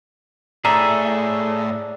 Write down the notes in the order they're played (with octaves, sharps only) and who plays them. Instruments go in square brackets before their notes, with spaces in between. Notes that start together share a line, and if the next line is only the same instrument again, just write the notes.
[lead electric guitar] A2 [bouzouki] D4 [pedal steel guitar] G#4 A4 E5 [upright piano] A#5